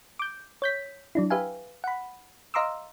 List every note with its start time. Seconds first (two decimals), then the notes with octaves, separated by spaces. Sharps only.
0.19 D6 G6
0.62 C#5 G6 B6
1.15 F#3 D4 E4
1.30 G4 B4 E5 F5 G#5
1.84 F#5 B5
2.54 D#5 F5 A#5 C6 D6 E6